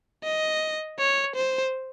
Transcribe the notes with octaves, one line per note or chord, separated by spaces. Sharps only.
D#5
C#5
C5